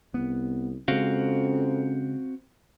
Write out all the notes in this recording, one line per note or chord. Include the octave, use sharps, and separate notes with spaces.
C2 B3
F2 C#3 G#3 C4 C#4 F#4 F5